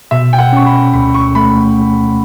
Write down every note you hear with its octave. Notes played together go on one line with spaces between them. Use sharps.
B2 E5
G5
F#5
C#4 C#6
B5
D2 B5
C#6
A3 B5